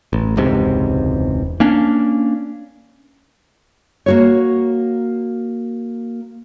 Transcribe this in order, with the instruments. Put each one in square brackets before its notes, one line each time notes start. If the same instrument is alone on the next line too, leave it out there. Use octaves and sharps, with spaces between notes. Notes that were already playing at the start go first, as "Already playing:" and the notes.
[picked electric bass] A1
E1 C#2 G#2 C3
A#3 C#4 D4
[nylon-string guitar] A#3 F#4 C#5